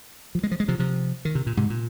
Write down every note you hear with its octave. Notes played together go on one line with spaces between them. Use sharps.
F3
G#3
F3
G#3
C3 F3
C3 F3
D#3
C3
A#2
G#2 C3
A#2